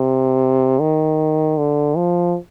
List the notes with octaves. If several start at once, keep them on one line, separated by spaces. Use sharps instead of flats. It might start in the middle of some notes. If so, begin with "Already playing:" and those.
Already playing: C3
D#3
D3
F3